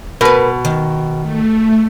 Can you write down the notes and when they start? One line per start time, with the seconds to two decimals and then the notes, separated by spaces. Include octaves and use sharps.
0.21 B2 A#4 B4
0.65 D#3
1.22 A3